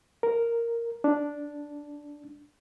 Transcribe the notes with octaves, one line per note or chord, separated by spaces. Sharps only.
A#4
D4